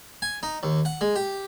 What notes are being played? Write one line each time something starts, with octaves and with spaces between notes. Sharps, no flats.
G#5
D#4
D#2
F#5
G#3
G4